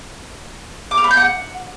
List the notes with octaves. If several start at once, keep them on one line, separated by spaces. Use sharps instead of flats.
D6
F6
B5
G6
F#5